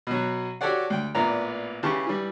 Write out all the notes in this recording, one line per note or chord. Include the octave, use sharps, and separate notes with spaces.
B2 F#3
F#4 G4 A4 C#5 D5 F#5
D2 G5
A1 A#2 B3 D5 A#5
C#3 E3 G4 A5 C#6
E3 G3